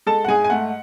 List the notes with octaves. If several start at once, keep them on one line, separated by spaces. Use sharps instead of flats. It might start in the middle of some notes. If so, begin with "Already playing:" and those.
G#3 A4 A5
F#5
G#2 G#4 G#5
G#5
A3 F#5